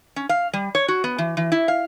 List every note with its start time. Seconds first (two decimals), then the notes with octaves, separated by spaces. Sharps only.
0.16 C#4
0.29 F5
0.53 G3
0.75 C#5
0.88 F#4
1.04 B3
1.18 E3
1.37 E3
1.52 E4
1.68 F5